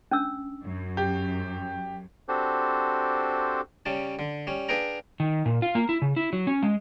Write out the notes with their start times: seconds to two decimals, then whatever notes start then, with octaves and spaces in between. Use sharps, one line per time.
0.11 C#4 D4 E6
0.65 F#2
0.97 G4
2.29 C4 D4 F#4 G4 A4 C5
3.86 C#3 G3 C#4 A5
4.19 D3
4.47 G3 C#4
4.69 D4 G#4 B4 F5 G5 A#5
5.20 D#3
5.46 A#2
5.62 F4
5.75 A#3
5.89 E4
6.02 C#3
6.16 E4
6.33 F#3
6.47 C#4
6.63 G#3